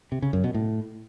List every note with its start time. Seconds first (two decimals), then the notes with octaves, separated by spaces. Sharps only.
0.12 C3
0.22 C#3
0.33 F#2
0.44 B2
0.54 A2